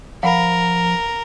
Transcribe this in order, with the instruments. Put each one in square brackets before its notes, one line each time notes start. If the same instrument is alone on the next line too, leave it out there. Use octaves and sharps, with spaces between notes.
[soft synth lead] F3 [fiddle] A#4 [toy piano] F5 F#5 B5